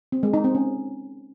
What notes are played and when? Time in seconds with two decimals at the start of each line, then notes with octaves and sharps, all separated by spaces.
0.12 C4
0.23 G#3
0.34 D#4
0.44 C4
0.55 C#4